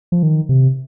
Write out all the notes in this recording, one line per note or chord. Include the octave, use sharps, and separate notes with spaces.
F3
D#3
C3